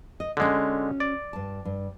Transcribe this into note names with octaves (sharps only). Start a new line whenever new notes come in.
D#5
D3 G#3 C#4 F#4
D5
G2 A5
G2